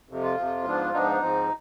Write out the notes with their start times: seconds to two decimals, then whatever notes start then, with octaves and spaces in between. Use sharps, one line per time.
0.09 F2 C3 F3
0.23 F4
0.38 F2 C3 F3
0.65 G#2 F3 B3 D4
0.93 G#2 F3 B3 D4 D#4
1.22 G#2 F3 C4